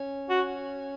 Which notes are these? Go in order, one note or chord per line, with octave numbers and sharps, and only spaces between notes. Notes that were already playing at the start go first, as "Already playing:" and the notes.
Already playing: C#4
F#4